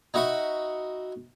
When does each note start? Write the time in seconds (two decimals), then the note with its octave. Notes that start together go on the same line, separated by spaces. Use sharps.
0.14 D#4 F#4 E5 B5 C#6